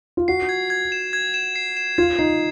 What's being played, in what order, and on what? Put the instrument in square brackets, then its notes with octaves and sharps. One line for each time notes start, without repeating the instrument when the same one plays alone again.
[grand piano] F4
[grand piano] F#4 [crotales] C7
[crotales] G#6
G#6
E7
G#6
E7
C7
E7
[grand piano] F4 [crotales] G#6
[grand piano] D#4 [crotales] C7